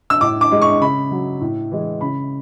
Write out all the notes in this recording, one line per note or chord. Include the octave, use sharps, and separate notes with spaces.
E6
A2 D6
D6
G#3
C#6
C#3 B5
F#3
A2
E3 G#3
C#3 B5